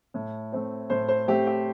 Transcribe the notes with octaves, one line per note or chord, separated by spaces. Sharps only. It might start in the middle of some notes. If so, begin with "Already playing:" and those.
A2
A3 C4
A2 C5
C5
A3 C4 G4
G4